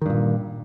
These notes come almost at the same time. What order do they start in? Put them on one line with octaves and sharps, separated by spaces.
D#3 G2 A#2